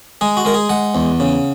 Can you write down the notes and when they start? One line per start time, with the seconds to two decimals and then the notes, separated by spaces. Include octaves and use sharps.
0.21 G#3 G#4
0.37 F#4
0.45 G#3 A#4
0.54 G#4
0.69 G#3 F#5
0.95 E2
1.20 C#3